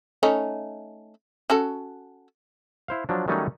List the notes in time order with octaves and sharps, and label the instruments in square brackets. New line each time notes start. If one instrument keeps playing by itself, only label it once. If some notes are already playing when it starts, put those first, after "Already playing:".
[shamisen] A3 C#4 D#4
C#4 F#4 A4
[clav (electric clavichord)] E4 C5 F5
F3 F#3 D4
D#3 F#3 G3 A3 C#4 D#4